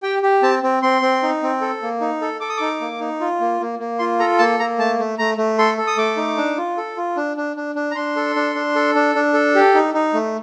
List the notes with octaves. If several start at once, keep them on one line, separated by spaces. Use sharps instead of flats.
G4 G5
G4
C4 A5
C4
C4 C6
C4
D#4
C4
A4
A#3
D#4
A4
A4 D6
D#6
D#4 D6
A#3
D#4
F4
A#3
A#3
A#3
F4 C6
A4 A#5
A#3 A5
A#3 A#5
A3 A5
A3
A3 A#5
A3
A4 C6
A4
D#6
A3 D6
D#4
D4
F4
A4
F4
D4
D4
D4
D4
A#5
D4 C6
A4
D4
D4
A4
D4
D4
A4
G4
D#4
D#4
A3